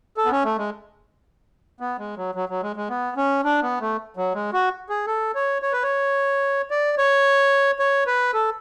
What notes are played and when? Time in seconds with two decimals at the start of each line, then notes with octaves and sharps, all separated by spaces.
0.17 A4
0.25 B3
0.31 C#4
0.45 A3
0.58 G#3
1.80 B3
1.99 G#3
2.17 F#3
2.35 F#3
2.49 F#3
2.63 G#3
2.76 G#3
2.90 B3
3.17 C#4
3.44 D4
3.63 B3
3.80 A3
4.17 F#3
4.34 G#3
4.53 F#4
4.89 G#4
5.07 A4
5.35 C#5
5.62 C#5
5.73 B4
5.83 C#5
6.71 D5
6.98 C#5
7.79 C#5
8.07 B4
8.34 A4